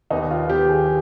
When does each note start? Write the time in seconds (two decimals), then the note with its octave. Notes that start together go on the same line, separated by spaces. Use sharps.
0.10 D#2 D#3 B3 D#4
0.31 F4
0.49 D#2 D#3 B3 G4
0.69 G#4